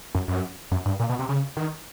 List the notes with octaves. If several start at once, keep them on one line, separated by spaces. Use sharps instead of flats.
F#2
F#2
F#2
G2
A#2
B2
C3
C#3
D#3